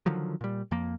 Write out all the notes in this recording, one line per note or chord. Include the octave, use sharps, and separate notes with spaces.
D3 D#3 F3 F#3
A#2 G3
F2 F3 A#3